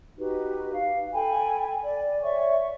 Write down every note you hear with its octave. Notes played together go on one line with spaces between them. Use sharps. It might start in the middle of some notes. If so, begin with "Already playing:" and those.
D#4 F#4 G4 B4
F5
A4 G5 G#5 B5
D5
C#5 D5 E5 C#6